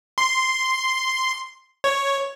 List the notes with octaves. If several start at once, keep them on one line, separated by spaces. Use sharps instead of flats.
C6
C#5